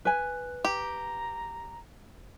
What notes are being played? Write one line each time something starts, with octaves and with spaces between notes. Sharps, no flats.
B4 G#5 F#6
G4 A#5